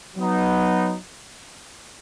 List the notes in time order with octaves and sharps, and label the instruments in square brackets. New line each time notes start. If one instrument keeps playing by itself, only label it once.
[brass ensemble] F#3 B3 D#4